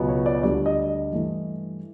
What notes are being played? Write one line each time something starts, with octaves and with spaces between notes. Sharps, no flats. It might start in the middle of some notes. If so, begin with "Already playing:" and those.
Already playing: C#2 B2 F#3 B3
C#5
D5
D2 D3 G3 D5
D#5
D#5
G2 E3 A3